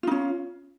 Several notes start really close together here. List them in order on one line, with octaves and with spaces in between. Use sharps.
F4 D#4 C#4